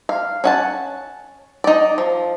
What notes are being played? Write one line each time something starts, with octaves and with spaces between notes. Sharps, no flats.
F5
C#4 F#5 A5
D#4 D5
F3